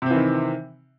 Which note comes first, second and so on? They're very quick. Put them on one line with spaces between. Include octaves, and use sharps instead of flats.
C3 C4 E3 D#3